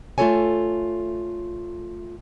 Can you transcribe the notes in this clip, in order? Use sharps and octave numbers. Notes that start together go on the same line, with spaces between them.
A3 F4 G4 A4 C#5 G#5